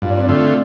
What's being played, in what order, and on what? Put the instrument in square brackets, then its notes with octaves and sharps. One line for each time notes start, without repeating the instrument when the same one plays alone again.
[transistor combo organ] G2 [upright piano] F4
[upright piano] D4
C4
[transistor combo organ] D3 A3 F4 [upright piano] D4